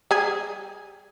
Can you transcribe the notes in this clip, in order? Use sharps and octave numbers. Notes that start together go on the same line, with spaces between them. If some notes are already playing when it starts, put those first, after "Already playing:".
G3 G#4